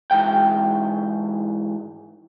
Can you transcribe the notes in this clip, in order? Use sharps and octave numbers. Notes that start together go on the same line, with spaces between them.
G#2 E3 G5